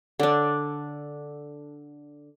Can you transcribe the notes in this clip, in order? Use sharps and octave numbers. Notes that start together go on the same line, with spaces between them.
D3 D4